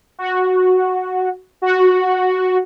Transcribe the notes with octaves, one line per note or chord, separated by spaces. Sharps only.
F#4
F#4